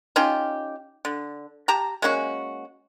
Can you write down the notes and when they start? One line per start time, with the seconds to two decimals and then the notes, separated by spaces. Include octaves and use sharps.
0.16 C#4 D#4 F4 G4
1.05 D3
1.68 G4 A5 A#5
2.02 G#3 A#3 C#4 F#4